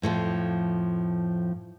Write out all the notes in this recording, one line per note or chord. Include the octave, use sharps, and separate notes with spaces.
F2 A2 D#3 F3